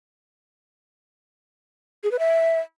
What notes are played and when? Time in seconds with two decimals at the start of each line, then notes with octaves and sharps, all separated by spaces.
2.04 G#4
2.11 B4
2.19 E5